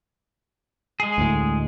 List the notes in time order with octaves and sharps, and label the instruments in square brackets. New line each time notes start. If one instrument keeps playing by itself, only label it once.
[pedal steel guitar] G#3 G#4
[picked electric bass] D2 A2